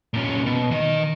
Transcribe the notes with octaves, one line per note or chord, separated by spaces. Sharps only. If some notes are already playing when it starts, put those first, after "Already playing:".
A#2 C#4
B2
D#3 D#5